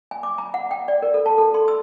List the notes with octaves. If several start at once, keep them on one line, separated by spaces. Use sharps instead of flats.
G#5
D6
A#5
F#5
G5
D5
A#4
A4
A5
A4
C6
E6